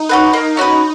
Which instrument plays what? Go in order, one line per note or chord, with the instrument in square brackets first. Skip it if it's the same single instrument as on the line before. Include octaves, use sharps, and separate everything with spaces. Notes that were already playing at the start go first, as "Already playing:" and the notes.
Already playing: [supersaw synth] D#4
[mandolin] C#4 F#4 B4
[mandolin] A#3 [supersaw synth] D#4
[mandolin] C#4 F#4 B4